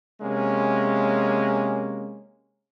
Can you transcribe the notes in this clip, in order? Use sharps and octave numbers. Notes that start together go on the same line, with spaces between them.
C3 G#3 A#3 C#4